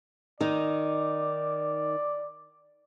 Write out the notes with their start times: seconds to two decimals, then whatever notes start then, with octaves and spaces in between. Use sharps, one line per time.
0.41 D#3 D#4 D5